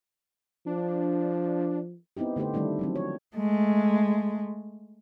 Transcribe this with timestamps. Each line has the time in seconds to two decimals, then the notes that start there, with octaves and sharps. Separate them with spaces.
0.66 F3 D4
2.17 B3 C4 D#4 E4 G4
2.36 D3 A3 D#4 G4 C5
2.54 D#3 G3 A3 D4 E4
2.79 F3 F#3 C4
2.96 C#5
3.36 G#3 A3